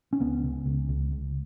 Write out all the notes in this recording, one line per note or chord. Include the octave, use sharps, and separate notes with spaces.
C#4
C#2 B3
C#3
C#2
C#2
C#2